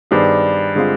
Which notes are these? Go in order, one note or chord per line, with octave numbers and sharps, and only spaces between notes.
G2 D#3 B3 D4 G#4 C5
D3 G#3 C4 F4 G#4